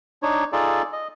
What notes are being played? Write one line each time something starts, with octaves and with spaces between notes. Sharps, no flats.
D4 D#4 C#5
D#4 F4 G#4 A4 D5
D#5